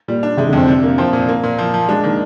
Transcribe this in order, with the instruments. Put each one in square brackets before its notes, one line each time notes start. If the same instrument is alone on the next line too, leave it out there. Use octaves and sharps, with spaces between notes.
[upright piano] A#2 [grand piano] G3
[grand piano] D4
[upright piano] C3 [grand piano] G#3
[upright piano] D3
[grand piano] F2 [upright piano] C4
[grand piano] C3 [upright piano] D4
[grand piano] A#3
[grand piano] F3 [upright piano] C4
[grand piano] A#2
A#3
A#2
[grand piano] F3 [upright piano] A#3
[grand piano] F3
[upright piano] G#3 [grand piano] D4
[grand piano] D#3 [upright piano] A#3